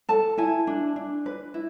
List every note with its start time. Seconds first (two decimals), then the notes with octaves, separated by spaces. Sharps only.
0.09 A4 A5
0.38 E4 G#5
0.67 D4
0.96 D4
1.26 B4
1.54 E4